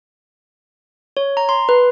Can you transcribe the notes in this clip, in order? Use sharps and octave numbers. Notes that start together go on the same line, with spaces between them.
C#5
A#5
C6
B4